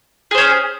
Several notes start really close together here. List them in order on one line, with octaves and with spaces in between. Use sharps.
G#4 C5 C#4